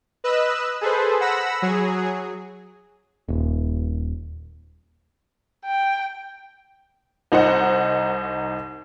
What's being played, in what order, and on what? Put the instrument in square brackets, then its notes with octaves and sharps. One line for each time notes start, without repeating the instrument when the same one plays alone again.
[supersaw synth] B4 D#5 E6 F#6
G#4 A4 B4 C5
F#5 B5 E6 A#6
F#3 G#4
[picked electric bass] D#1
[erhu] G5
[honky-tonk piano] C2 D#4 C5 F#5